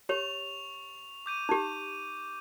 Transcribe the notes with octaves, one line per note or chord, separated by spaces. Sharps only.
G4 C#5 C#6 F7
D6 G6 D#7
D#4 G4